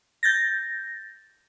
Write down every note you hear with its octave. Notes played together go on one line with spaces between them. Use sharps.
G6 A6 A#6